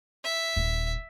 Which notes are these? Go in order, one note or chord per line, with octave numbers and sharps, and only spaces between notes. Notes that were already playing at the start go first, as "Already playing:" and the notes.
E5
D#1